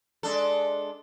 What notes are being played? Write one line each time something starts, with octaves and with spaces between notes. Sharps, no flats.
G#3 D4 A4